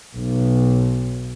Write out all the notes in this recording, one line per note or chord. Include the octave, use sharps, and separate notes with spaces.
B1